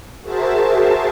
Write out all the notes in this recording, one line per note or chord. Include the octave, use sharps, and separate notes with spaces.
F#4 G#4 A#4 C5 E5 A5